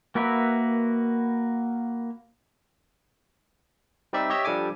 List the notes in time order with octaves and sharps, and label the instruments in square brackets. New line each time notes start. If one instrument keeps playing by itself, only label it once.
[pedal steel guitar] A#3 F#4 A#4 B4 E5
[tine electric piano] G3 C4 D#4 G4 D5 E5
G4 C#5 D#5 E5
F3 G3 D4 A4 G#5 D6